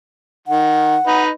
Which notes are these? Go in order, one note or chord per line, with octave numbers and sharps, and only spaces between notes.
D#3 F#5
D#4 B4